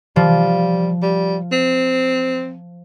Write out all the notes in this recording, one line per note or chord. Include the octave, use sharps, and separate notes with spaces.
F3 G3
G3
C4